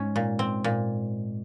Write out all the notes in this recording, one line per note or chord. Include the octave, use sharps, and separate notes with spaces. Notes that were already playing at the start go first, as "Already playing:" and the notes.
Already playing: G#2 C#4
A#2
C4
A#2